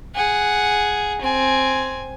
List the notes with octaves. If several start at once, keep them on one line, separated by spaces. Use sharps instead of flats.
G#4 F#5
C4 G#5